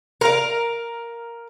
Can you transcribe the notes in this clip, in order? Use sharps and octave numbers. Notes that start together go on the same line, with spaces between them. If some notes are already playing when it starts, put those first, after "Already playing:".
A#4 F5